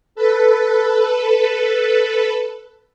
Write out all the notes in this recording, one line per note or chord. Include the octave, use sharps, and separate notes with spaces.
A4 B4